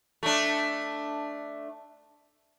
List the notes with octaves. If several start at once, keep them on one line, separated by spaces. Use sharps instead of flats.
A3 D4